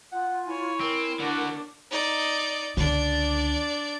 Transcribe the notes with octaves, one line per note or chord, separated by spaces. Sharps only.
F4 F#5
E4 C#5 G#5
C4 A#4
D3 D4 F#4
D#4 D5
C#2 D3 D4 D5